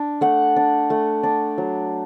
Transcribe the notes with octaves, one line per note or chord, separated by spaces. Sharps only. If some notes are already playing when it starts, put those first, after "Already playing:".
Already playing: D4
A3 F#5
D4
A3
D4
F#3